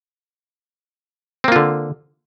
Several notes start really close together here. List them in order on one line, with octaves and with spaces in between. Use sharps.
C4 A#3 F4 D3